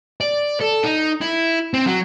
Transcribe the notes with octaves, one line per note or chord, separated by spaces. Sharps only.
D5
A4
D#4
E4
C4
F#3